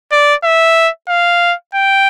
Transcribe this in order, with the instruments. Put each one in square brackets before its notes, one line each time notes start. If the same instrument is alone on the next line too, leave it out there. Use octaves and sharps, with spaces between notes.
[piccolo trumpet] D5
E5
F5
G5